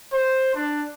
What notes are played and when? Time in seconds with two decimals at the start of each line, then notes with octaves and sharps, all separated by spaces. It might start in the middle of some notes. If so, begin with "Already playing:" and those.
0.12 C5
0.54 D4